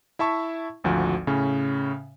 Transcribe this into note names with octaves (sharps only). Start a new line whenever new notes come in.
E4 E5 A5 C#6
G#1 D2 F3 F#4
A2 C#3 C#4